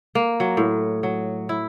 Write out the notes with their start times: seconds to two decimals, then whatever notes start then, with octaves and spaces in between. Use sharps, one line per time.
0.15 A#3
0.40 F#3
0.57 A2
1.03 F#3
1.49 E4